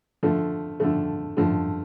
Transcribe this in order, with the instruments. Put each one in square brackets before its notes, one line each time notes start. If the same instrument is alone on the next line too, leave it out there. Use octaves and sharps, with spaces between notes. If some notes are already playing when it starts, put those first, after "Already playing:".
[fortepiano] D3 F3 A3
D3 F3 A3
D3 F3 A3